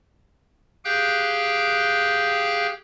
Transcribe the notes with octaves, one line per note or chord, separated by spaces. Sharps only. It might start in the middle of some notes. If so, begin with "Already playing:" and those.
G4 G#4 F5 G5 F#6 G6